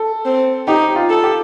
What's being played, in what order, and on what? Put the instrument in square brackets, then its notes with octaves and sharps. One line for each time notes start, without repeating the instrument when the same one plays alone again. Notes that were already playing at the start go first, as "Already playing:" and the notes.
Already playing: [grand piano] A4
[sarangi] C4
[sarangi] D#4 [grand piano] G4
[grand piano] F4
[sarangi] A4
[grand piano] G4